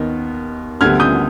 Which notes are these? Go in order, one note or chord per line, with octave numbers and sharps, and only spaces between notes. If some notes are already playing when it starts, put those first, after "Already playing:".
Already playing: D#2 D#3 B3 D#4
D2 D3 G3 B3 F6 G#6
D#6 G6